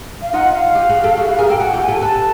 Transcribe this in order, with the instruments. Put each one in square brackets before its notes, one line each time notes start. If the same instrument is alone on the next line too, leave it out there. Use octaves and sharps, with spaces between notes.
[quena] F5
[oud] D#4 F4 [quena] F#5
[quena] F5
[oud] F4 G4
F#4 G#4
G4 A4
F#4 G#4
E4 F#4
G#4 A#4
[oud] G4 A4 [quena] G5
[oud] F#4 G#4 [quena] F#5
[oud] F4 G4
[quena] G#5
[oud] G4 A4
[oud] A4 B4 [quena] A5